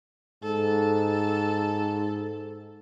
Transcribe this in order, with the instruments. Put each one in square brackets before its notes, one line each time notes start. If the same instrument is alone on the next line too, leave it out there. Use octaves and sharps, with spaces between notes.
[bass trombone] G#2 [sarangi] A4